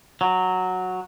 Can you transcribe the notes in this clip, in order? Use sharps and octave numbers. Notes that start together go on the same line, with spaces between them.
F#3